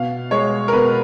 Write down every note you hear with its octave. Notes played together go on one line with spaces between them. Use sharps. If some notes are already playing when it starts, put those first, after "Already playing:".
Already playing: B2 F5
G#3 C#5
A#4
B2 B4